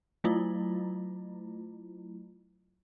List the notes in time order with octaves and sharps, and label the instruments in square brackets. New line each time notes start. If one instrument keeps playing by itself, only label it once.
[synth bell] F#3 A3 E4 F4